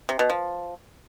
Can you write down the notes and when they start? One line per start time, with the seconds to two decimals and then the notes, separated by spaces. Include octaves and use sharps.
0.09 C3
0.19 B2
0.30 F3